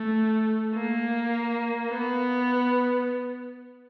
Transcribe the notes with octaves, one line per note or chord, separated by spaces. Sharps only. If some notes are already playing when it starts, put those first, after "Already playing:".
Already playing: A3
A#3
B3